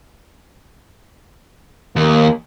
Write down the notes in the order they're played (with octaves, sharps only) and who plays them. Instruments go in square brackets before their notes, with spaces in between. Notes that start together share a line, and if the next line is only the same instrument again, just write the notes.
[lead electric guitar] D#2 [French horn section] A#3